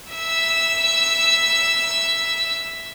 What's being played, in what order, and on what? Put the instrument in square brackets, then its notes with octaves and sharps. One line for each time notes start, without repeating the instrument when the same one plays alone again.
[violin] E5 E6